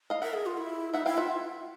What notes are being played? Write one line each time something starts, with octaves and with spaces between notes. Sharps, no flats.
D#5 F5
A#4 E5 F#5
G#4
F4
E4
D#4 E5 F#5
E4 F5 G5
F4 E5 F#5